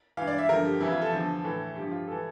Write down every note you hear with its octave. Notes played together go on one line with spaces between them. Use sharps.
G2 E3 F5
D5
E5
G2 D3 F3 A#4
G4
F2 E3 E4
F4
A4
E2 D3 F3
A2 E3
G2 F3 G4
F4
E3 A4